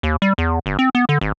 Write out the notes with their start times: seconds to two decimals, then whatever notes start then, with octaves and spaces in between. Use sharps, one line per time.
0.03 D#2
0.22 G3
0.38 E2
0.66 G1
0.79 C4
0.95 B3
1.09 D3
1.21 G#1